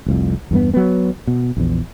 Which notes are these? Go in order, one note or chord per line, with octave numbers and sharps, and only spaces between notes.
F1 C2 F2
E2 G2 B3
F#3 B3
B2
A#1 E2